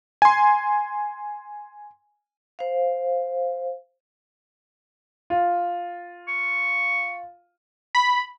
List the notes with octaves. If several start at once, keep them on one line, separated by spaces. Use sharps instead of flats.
G#5 C6
C5 F5
F4
C#6
B5